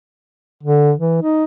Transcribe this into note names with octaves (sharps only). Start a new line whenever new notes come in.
D3
E3
D#4